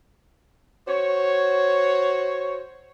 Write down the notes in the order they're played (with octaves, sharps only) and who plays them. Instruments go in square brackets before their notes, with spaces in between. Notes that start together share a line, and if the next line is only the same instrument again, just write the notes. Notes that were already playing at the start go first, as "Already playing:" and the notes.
[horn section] F#4 C5 C#5